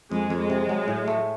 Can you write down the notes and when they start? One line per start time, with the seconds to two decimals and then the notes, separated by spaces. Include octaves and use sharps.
0.12 F2 G#3
0.30 F2
0.40 G#3
0.50 C3
0.69 F#3
0.88 A2
1.08 A3